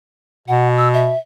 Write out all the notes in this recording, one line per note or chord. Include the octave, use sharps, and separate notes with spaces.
B2 F#5
E6
E5